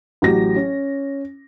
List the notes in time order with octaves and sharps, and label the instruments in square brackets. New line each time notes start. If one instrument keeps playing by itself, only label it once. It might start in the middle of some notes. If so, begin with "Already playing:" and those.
[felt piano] A1 F#3 G4 A#6
C#4